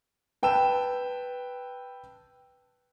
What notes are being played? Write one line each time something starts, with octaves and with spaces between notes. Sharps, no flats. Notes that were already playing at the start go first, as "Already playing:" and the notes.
B4 G5 A5 E6 E7